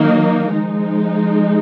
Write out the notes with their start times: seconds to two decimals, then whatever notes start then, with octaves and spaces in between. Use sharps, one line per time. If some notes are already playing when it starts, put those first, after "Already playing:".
Already playing: D#3 F#3 A#3 D#4
0.51 F3 G#3 D#4